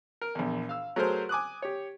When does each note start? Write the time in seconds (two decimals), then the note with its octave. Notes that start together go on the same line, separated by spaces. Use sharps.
0.21 A#4
0.35 A#1 E2
0.69 F5 E6
0.96 F#3 A3 G#4 A#4 C5
1.29 G#5 D6 D#6 F#6
1.62 G4 C#5